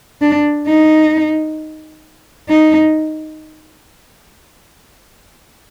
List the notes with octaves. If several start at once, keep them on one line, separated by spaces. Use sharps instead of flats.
D4
D#4
D#4